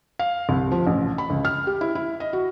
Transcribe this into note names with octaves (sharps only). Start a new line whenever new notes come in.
F5
C2
F3
A1
B5
C#2
F6
G4
E4
E4
D#5
F#4